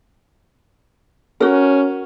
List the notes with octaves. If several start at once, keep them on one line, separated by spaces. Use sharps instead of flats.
C#4 F#4 A#4